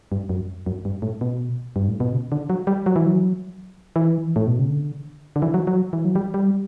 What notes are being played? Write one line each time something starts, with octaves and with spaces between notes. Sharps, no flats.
G2
F#2
F#2
G2
A2
B2
G2
A2
B2
C#3
D3
F#3
G3
F#3
E3
F#3
E3
A2
B2
C#3
D3
D3
E3
F#3
F#3
E3
F#3
G3
G3